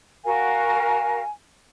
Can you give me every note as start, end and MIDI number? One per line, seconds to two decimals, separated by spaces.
0.25 1.21 66
0.25 1.21 70
0.25 1.21 77
0.25 1.31 80